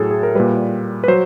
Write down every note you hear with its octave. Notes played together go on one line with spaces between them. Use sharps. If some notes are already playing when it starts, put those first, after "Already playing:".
Already playing: A2 F#3 G#4 A4
G#4
A#4
A#2 G3 B4
B4
F#3 C5